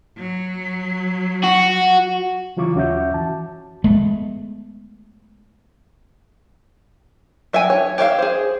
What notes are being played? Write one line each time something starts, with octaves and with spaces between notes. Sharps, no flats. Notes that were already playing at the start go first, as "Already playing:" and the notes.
F#3
F#4
C#3 E3 F#3 F4 C#6 D6
D#2 C#4 F#4 E5 D6 G6
E3 A5
G#3 A3 B3
F#3 E5 G5 G#5
C#5
G4 C#5 E5 F5
G#4 C5